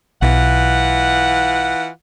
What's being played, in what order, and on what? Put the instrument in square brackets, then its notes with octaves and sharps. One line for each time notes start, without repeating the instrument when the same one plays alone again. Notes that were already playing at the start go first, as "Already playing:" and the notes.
[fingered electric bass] B1 [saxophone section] E3 F4 F#5